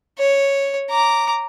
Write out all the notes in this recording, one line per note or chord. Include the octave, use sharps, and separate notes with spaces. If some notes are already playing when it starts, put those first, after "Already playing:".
C#5
A#5 D6